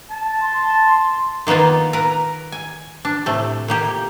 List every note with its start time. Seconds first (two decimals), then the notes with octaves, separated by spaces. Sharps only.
0.10 A5
0.42 C6
1.47 D#3 A#3 B3 D#4 F4
1.93 A#4 B4
2.52 G#5
3.05 D4
3.26 A2 C3 A3
3.68 A#2 A#3 G4